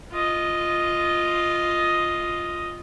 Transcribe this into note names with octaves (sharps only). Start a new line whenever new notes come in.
F4 D#5